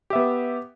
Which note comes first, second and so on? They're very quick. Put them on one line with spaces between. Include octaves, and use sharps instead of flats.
G4 E5 B3